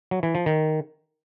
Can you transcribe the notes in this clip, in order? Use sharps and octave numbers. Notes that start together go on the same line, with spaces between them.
F#3
E3
F3
D#3